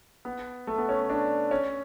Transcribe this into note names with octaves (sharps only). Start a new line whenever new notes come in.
B3
A3
B3
C#4
D4
C#4